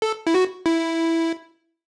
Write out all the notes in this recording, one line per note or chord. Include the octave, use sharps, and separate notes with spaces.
A4
E4
F#4
E4